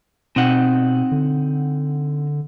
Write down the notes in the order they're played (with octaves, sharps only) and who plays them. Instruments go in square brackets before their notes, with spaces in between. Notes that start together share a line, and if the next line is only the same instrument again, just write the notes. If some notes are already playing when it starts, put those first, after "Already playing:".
[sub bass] B2 [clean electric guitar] C4 D#4 F#5
[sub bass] D3